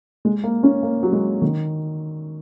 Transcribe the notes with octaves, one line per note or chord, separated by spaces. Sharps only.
G#3
A#3
C#4
A#3
F#3
G#3
D#3